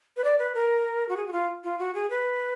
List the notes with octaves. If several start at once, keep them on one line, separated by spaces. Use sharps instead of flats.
B4
D5
B4
A#4
F#4
G#4
F#4
F4
F4
F#4
G#4
B4